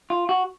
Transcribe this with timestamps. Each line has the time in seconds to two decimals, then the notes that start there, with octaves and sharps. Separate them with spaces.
0.10 F4
0.29 F#4